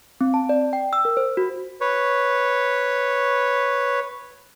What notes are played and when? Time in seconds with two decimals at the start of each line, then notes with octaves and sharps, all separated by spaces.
0.21 C4
0.34 A5
0.49 D5
0.73 G5
0.93 E6
1.05 A#4
1.17 C5
1.37 F#4
1.81 B4 C#5